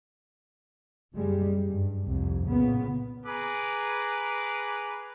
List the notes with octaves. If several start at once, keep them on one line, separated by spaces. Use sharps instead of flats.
F#1 G3 G#3
G2
C2 F2
A#2 C#3 B3
G#4 B4 A#5 D6